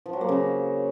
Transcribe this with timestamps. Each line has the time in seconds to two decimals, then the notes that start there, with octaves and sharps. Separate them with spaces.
0.06 F3
0.13 F#3
0.21 A#3
0.28 C#3